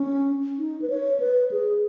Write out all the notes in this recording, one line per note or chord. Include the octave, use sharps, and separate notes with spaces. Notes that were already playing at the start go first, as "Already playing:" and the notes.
Already playing: C#4
D#4
B4
C#5
B4
G#4